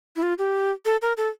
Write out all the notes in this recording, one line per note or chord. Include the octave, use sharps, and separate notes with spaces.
E4
F4
G4
A4
A#4
A4